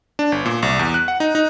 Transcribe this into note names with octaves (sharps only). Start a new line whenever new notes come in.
D4
G1
A#2
C2
E2
F#6
F#5
D#4
D#4